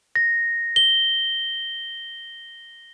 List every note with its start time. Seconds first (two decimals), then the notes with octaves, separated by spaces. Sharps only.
0.16 A#6
0.76 G7